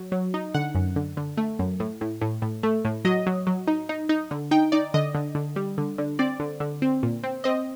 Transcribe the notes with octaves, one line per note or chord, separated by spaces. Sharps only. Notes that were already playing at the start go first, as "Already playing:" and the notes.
Already playing: F#3
F#3
D#4
D3 F#5
F#2
D3
D3
A3
F#2
A2
A2
A2
A2
A3
A2
F#3 D#5
F#3
F#3
D#4
D#4
D#4
D3
D#4 G5
D#4 D5
D3 D#5
D3
D3
G3
D3
D3
C4 D5
D3
D3
C4
A#2
C4
C4 D#5